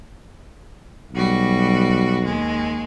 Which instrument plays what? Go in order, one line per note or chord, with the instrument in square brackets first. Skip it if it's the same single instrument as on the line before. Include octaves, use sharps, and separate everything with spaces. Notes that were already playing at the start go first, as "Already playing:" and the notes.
[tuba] B1 [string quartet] G3 F#4
[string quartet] D#2 G#3